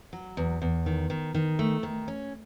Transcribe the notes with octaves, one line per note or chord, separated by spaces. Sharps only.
F#3
E2
E2
D#3
D#3
D#3
A3
D#3
C#4